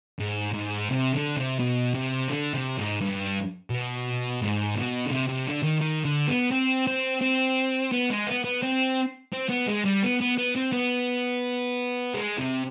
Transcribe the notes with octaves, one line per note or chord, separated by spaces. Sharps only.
G#2
G#2
C3
D3
C3
B2
C3
D3
C3
G#2
G2
B2
G#2
B2
D3
C3
C3
D3
D#3
D#3
D3
B3
C4
C4
C4
B3
G#3
B3
B3
C4
C4
B3
G#3
G3
B3
B3
B3
C4
B3
G#3
C3